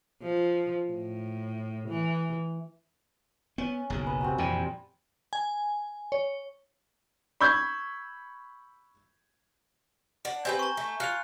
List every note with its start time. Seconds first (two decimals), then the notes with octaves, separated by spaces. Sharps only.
0.22 F3
0.92 A2
1.88 E3
3.58 B3 C#4
3.90 F#1 B1 G#4 A#5
4.07 B4
4.21 C3 F#4 A#5
4.38 F2 A#2 E3 G3
5.33 G#5
6.12 C#5
7.40 B5 C#6 E6 G6 G#6
10.25 D4 F#5
10.45 C4 G4 B4 G#5 G6 G#6
10.59 A#5 C#6
10.77 A3
11.00 F4 F#6 C#7 F7